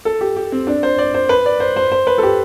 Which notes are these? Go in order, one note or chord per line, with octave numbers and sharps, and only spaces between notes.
A4
G4
G4
C4
D4
C5
D5
C5
B4
D5
C5
C5
C5
B4
A4
G4